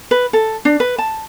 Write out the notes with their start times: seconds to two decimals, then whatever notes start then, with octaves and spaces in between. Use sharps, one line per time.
0.11 B4
0.33 A4
0.65 D4
0.80 B4
0.98 A5